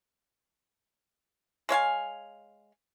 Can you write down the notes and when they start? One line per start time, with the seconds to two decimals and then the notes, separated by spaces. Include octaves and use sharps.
1.69 G#3 C#5 F5 G#5